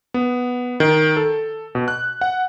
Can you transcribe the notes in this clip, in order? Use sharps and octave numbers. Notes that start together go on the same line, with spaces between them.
B3
D#3
A4
B2
F#6
F#5